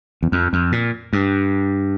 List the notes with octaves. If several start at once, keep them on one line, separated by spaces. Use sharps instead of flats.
E2
F2
F2
A#2
G2